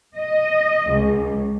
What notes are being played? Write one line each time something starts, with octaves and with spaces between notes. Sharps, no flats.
D#5
C#2